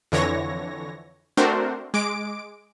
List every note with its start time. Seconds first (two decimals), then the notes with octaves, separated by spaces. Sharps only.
0.12 F2 D3 E3 C#5 A#6
1.37 A3 C4 D4 F#4 A#4 C5
1.94 G#3 D6 D7